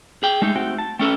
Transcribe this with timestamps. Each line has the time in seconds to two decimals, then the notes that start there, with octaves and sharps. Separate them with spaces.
0.23 G#4 G5
0.42 G#3 A3 D#4
0.56 C4 F#4 G5
0.78 A5
0.99 A3 C#4 A4 G5 E6